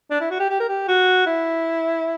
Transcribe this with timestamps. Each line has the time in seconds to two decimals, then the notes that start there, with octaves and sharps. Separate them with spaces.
0.10 D4
0.21 E4
0.31 F#4
0.39 G4
0.50 G4
0.60 A#4
0.68 G4
0.88 F#4
1.26 E4